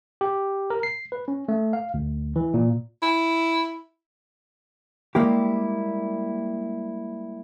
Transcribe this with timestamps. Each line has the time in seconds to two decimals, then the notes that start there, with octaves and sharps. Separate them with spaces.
0.21 G4
0.70 A#4
0.83 C7
1.12 B4
1.28 C#4
1.48 A3
1.73 F5
1.94 D2
2.36 E3
2.54 A#2
3.02 E4
5.15 G3 G#3 A#3 E4 G4